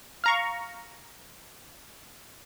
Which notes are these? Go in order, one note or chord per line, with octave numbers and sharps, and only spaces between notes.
F5 A#5 C#6